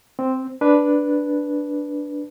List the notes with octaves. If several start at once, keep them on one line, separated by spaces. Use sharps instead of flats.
C4
D4 B4